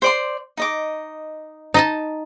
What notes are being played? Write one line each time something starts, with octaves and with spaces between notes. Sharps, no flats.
C5 D5 C6
D#4 D#5 D6
D#4 D#5 A5